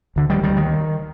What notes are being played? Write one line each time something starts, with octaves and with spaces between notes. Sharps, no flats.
D2 D3
D#3 G3
D#3 G3
D#3